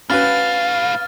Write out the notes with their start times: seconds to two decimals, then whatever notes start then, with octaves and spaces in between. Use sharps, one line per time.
0.10 A2 C#4 F#4 B4 F5 F6 A6